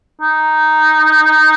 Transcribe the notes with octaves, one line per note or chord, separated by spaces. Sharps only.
D#4